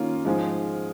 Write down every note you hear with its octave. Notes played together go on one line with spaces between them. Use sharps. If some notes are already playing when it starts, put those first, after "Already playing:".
Already playing: D#3 A#3 C#4 F4
G#2 F3 G#3